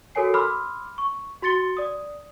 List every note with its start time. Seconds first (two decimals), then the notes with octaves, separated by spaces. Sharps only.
0.15 F#4 A4 A#4 C#5 G#5 C7
0.34 B5 C6 D6 E6 F6
0.98 C#6
1.42 F#4 C6 A6 C#7 G7
1.77 D5 D#6